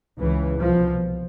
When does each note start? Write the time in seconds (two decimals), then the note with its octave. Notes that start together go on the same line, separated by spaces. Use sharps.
0.19 C#2 C#3 E3
0.60 C2 B2 F3